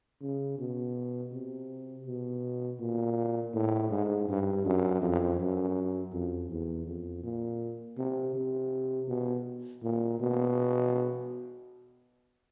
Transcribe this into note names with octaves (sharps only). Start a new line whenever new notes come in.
C#3
B2
C3
B2
A#2
A2
G#2
G2
F#2
F2
F#2
F2
E2
F2
A#2
C3
C3
B2
A#2
B2